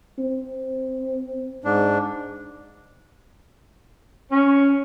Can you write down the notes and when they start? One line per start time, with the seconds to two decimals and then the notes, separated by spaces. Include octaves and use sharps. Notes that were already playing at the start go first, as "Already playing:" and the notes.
0.18 C4
1.64 G#2 D4
4.31 C#4